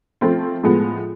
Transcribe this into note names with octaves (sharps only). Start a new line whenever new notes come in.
F3 A3 C4 F4
A2 F3 G#3 B3